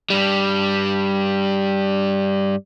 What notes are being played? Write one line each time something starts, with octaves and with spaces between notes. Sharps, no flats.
G2 G3